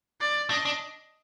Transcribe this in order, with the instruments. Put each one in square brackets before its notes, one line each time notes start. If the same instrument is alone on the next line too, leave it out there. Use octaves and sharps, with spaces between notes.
[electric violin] D5
[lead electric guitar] D4 [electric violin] D#5
[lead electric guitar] D4